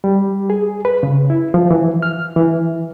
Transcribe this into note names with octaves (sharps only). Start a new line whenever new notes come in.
G3
G#4
B4
C#3
E4
F3
E3
F6
E3